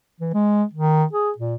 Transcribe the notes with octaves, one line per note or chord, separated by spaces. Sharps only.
E3
G#3
D#3
G#4
A#2